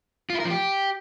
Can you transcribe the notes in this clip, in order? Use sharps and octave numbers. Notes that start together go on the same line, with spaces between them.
F4
E4
A#4
F3
G4